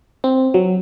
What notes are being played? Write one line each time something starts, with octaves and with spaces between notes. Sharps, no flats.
C4
F#3